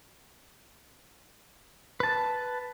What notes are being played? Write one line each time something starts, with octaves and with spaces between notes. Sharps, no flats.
B4 A5